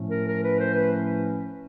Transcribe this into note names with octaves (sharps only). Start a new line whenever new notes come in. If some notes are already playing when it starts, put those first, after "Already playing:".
Already playing: A2 F3 A3 C#4
A#4
A#4
B4
C5
B4